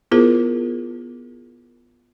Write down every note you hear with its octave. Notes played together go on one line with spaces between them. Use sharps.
B3 E4 F4 G#4 A#4 C5